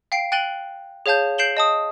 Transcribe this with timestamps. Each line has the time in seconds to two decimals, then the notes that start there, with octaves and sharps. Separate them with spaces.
0.12 F5 G5 C7 D7
0.32 G5 F#6 A6 D#7 F#7 G7
1.06 G#4 C#5 F5 A5 G6
1.38 G6 C7 D7 E7 F#7 G7
1.57 D#5 A5 D#6